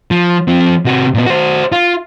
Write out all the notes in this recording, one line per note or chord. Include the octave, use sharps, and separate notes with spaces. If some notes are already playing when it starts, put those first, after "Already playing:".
F3
F3 C4
C3 F#4
A#2 B3
F#4 C5
F4